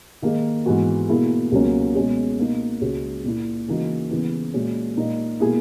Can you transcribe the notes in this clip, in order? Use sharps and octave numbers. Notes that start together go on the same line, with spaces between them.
D#3 A#3 D#4 G#4
G#2 E3 B3 F#4
B2 A#3 E4 G#4
C#2 B2 F#3 A#3 C#4
B2 G#3 C#4 G#4
B2 A#3 D#4
C#2 C#3 G#3 C#4 F#4
A#2 A#3 E4
C#3 E3 A#3 D#4 F#4
C#3 E3 B3 E4
A#2 G#3 C#4 F#4
A#2 A#3 D#4
B2 A#3 E4 G#4